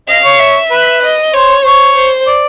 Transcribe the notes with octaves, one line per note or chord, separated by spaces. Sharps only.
D#5 F5
C#5
E5
B4
D#5
C5 C#5
C5 C#5
C5
D5